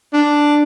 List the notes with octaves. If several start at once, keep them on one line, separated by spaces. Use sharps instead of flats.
D4